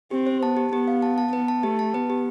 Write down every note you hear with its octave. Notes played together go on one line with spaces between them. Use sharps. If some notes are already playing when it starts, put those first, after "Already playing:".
C4 G4
C5
B3 A5
G4
B3 G4
F5
A5
A5
B3 B4
A5
A3 G4
A5
B3 B4
G4